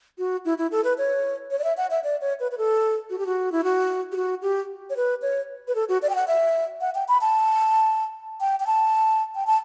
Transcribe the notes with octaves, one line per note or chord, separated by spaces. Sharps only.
F#4
E4
E4
A4
B4
C#5
C#5
D5
E5
F#5
E5
D5
C#5
B4
B4
A4
F#4
G4
F#4
E4
F#4
G4
F#4
G4
C#5
B4
C#5
B4
A4
F#4
D5
G5
F#5
E5
F#5
G5
B5
A5
G5
G5
A5
G5
A5